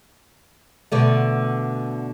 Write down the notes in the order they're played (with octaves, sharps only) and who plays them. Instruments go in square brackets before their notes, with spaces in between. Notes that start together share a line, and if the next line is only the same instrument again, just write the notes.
[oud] B2 D3 A3